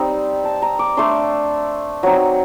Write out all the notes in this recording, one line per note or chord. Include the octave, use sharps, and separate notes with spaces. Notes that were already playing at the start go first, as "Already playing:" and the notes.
Already playing: G3 C4 D#4
A5
A#5
D6
A3 D4 C6
F#3 C4 D#4 A#5